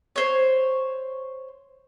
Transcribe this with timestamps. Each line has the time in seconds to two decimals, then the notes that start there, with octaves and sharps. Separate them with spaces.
0.16 C5 C#5